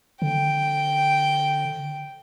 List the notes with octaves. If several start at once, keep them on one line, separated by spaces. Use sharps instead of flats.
D3 G5